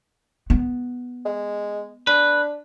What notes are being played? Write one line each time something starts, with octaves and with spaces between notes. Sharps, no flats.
B3
G#3
D4 B4